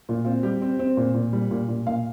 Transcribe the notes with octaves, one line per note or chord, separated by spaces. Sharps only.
A#2 F4
C4 F4
G3 G4
C4
C4
A#2
A#2
G3
A#2
A#2
A#2 F5